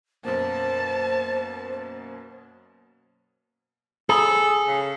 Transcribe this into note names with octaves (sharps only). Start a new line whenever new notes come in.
F#2 B2 A#3 C5 A5
G#4 A4
C#3